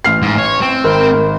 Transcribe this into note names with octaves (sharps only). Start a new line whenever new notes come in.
A1 F6 C7
G#2
C#5
C4
G#1 A#4